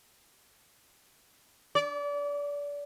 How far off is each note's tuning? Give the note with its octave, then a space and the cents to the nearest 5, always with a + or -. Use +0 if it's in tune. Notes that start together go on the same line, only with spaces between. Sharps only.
D5 -30